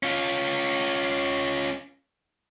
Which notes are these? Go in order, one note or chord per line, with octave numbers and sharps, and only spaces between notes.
C#4 F4